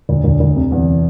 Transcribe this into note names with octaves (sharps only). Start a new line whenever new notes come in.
D2
D2
D2
C3
E2